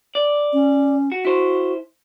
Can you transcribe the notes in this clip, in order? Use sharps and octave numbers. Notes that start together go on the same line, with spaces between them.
D5
C#4
F#4
E4 F#4 C5